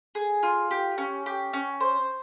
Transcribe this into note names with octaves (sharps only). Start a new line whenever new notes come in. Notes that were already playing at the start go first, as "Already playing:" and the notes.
G#4
F4
G4
C#4
G4
C#4
C5